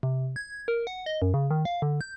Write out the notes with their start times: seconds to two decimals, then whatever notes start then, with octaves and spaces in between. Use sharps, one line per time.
0.03 C3
0.36 G#6
0.68 A#4
0.87 F#5
1.06 D#5
1.22 F#2
1.34 C#3
1.51 D#3
1.65 F5
1.82 D3
2.01 G6